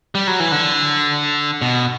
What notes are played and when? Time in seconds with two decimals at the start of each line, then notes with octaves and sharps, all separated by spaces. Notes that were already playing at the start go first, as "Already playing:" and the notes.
0.15 G3
0.27 F#3
0.40 E3
0.52 D3
1.62 B2